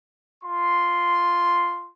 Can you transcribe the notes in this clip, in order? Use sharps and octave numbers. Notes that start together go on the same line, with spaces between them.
F4 C6